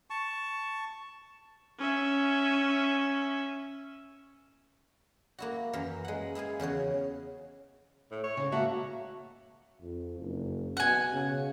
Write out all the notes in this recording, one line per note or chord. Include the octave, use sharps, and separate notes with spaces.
A5 C#6
C#4 E5
A#3 E4 F#4
F#2 E3 A#4
G#3 F#5
E4 G#4 F5 G#5
E2 C#3 F#4 C#5
A2
C#5
C#3
A#3 F#4 E5 A5
F2
F#1
B2 F#5 G#5
C#3